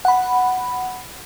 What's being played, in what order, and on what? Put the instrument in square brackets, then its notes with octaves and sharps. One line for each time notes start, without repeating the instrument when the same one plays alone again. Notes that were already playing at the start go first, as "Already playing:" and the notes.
[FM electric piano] F#5 B5